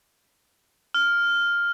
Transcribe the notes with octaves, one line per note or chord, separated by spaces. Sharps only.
F6